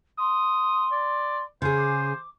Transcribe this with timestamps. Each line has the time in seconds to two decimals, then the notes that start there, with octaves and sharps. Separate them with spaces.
0.18 C6 D#6
0.92 D5
1.62 C#3 G#4 C5
1.76 D6
2.04 D6